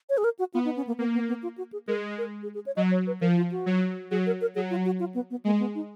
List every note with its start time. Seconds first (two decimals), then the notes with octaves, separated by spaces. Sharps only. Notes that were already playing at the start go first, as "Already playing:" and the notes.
0.09 C#5
0.17 G#4
0.24 A#4
0.39 F#4
0.54 B3 F4
0.65 D#4
0.76 C#4
0.87 A#3
0.99 A#3 B3
1.14 B3
1.28 B3
1.43 F4
1.58 F#4
1.73 G#4
1.87 G#3 A#4
2.18 A#4
2.43 G#4
2.55 G#4
2.66 C#5
2.76 F#3 D#5
2.91 C#5
3.07 B4
3.21 F3 A#4
3.37 F4
3.52 F#4
3.66 F#3
4.11 F#3 G#4
4.26 A#4
4.41 A#4
4.55 F#3 G#4
4.70 F4
4.85 F#4
5.00 F4
5.14 B3
5.30 B3
5.44 G#3 A#3
5.59 B3
5.75 D#4